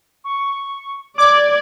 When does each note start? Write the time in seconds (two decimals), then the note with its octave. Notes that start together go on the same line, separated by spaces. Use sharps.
0.24 C#6
1.18 D5 D6 G#6